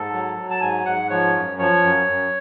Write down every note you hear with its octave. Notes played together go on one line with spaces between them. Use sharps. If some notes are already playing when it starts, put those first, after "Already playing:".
Already playing: G#2 A4
F#3
F#3
A5
G#2 G#5
G#2 F#5
F3 C#5
F#2
F3 C#5
F#2
F#2